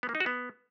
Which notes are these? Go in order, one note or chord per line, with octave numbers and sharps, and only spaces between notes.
B3
A#3
D#4
F#4
B3